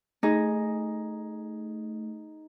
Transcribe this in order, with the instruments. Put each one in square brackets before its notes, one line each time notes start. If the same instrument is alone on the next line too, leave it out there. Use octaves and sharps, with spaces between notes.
[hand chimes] A3 [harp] D#4 G#4